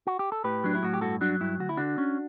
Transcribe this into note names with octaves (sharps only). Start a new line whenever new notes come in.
F#4
G4
A4
A2 G4 B4
F#3 D4
E4
A2 F#4
G4
G2 F#4 A4
F#3 D4 F#4
G2 E4
D2 F#4
E4
D3 D4 F#4
C#4